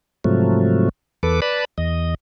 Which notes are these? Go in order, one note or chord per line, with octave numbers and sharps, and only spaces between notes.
G#2 C3 F3 F#3 A3
E2 A4 B4 D6
B4 D5 A5 B5
E2 D#5